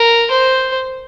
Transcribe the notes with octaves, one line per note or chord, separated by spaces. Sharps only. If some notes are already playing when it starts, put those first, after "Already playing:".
Already playing: A#4
C5